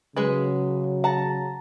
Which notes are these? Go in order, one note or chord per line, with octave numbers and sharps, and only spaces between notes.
C#3 F#3 G#3 G#4 B4
F#5 A5 A#5